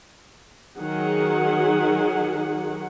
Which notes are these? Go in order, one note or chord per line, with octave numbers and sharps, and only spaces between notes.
D#3 F#3 G#4 F#5